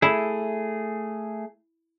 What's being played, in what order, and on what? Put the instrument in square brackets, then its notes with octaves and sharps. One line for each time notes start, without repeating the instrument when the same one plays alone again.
[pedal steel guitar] A3 G#4 [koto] E4